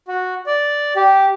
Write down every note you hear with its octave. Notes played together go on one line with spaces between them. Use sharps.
F#4
D5
G4